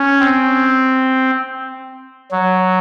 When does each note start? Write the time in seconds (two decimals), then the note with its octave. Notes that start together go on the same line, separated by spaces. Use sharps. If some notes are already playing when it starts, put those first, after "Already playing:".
Already playing: C#4
0.20 C4
2.31 F#3